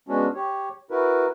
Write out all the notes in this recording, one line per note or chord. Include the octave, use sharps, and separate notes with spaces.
G#3 B3 C#4 D4 F#4
G4 C#5
E4 F#4 A#4 B4